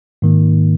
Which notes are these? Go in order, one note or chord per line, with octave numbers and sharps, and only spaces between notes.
G#2 D#3 A#3